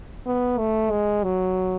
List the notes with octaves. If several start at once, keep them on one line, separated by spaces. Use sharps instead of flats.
B3
A3
G#3
F#3